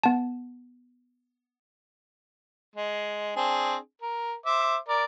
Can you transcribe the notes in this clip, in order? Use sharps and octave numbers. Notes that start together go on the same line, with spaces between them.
B3 A5
G#3
C4 D4 G#4
A#4
C5 E5 D6
A#4 D5